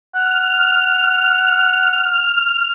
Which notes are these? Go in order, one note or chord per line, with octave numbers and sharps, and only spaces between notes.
F#5 F6